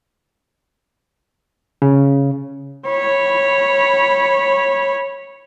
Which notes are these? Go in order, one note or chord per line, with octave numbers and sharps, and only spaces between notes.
C#3
C#5 B5